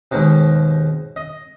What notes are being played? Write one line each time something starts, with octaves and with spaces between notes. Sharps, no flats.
D#2 G#2 B2
D#5